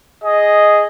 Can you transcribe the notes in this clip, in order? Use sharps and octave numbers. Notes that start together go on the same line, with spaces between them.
G#4 D#5